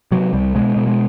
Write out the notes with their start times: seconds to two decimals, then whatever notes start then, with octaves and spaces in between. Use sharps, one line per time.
0.11 C3 F#3
0.33 C2 G3
0.55 B2 G#3
0.76 B2
0.87 G#3